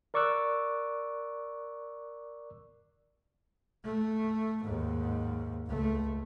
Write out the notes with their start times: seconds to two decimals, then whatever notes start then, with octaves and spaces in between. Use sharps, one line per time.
0.14 A#4 D5 C#6 D6 E6 F#6
3.85 A3
4.64 D#2 G#2
5.67 C#2 A3